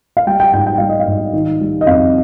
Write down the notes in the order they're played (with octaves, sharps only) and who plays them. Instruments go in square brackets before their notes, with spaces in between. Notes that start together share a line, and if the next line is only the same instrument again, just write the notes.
[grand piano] F5
G3 G5
G5
G#2 G5
G5
G3 F5
D#5
F5
G#2
D#3
G3
D#5
F2 F5